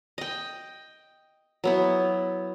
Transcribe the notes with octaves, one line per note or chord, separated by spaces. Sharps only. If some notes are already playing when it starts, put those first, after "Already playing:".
D#5 G5
F#3 B3 E4